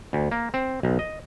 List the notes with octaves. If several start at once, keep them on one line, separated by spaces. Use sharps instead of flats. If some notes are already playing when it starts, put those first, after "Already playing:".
D2
A#3
C4
B1
D#5